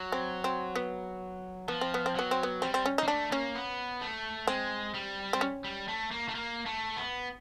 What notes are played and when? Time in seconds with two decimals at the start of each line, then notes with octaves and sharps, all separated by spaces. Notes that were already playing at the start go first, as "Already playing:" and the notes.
Already playing: F#3
0.12 C4
0.44 C4
0.76 B3
1.68 F3 B3
1.81 C4
1.94 B3
2.06 C4
2.15 F#3 B3
2.31 C4
2.43 B3
2.62 G3 C4
2.74 C4
2.86 C#4
2.98 D#4
3.03 A#3
3.08 A3 D4
3.31 A#3 C#4
3.55 B3
4.01 A3
4.47 G#3 C4
4.94 G3
5.33 C4
5.41 C#4
5.64 G3
5.88 A3
6.11 A#3
6.28 A3
6.35 A#3
6.66 A3
6.96 B3